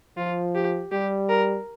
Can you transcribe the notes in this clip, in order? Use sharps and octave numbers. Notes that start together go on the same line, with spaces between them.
F3 F4
G4
G3 G4
A#4